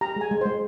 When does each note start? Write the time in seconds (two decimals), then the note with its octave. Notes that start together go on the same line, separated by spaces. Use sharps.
0.01 G4 A#5
0.16 G#3 G#5
0.31 G#3
0.41 G#3 C5